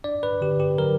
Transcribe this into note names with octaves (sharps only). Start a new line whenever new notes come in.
D4 D5
B4
D3 G4
G4
F#3 A#4